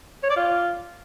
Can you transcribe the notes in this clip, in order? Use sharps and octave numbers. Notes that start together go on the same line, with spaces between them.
C#5
D5
F4